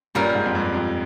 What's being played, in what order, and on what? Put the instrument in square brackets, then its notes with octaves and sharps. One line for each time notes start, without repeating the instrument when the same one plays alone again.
[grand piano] G2 [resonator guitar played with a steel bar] A#2 G3 C#4 F4 A#4
[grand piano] G#2
F2
G2
F2